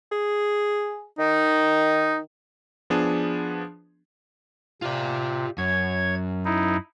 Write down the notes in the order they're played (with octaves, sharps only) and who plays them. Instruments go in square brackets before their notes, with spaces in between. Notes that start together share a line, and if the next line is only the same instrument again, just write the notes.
[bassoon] G#4
[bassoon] D#3 [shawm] D#4
[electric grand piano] F3 B3 D4 G#4
[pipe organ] C3 [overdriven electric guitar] F4 D5
[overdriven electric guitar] F#2 [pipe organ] C#5 G#6
[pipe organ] D#4 E4